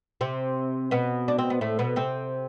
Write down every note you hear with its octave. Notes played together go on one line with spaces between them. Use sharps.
C3 C4
B2 B3
D4
C4
B3
A2 A3
B2 B3
C3 C4